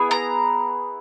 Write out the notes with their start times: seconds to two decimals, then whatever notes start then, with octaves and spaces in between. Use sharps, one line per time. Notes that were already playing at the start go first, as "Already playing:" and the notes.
Already playing: B3 E4 G#4
0.11 A#5